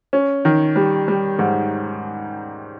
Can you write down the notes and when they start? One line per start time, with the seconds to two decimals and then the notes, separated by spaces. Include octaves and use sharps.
0.13 C#4
0.45 D#3
0.76 G3
1.08 G3
1.39 G#2